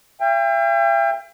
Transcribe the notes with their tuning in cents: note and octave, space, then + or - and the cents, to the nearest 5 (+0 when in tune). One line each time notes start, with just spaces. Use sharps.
E5 +40 G5 +30